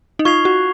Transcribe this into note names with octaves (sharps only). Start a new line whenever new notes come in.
D#4
F4 C#6 G#6 C7 F7
F#4